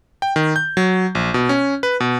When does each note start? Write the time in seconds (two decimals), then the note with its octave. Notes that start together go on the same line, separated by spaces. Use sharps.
0.22 G5
0.36 D#3
0.56 G6
0.77 F#3
1.15 A#1
1.34 B2
1.49 C#4
1.83 B4
2.00 B2